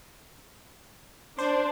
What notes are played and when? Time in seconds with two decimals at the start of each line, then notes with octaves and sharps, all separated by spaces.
1.39 D4 C5